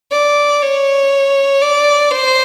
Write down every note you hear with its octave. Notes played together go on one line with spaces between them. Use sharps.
D5
C#5
D5
C5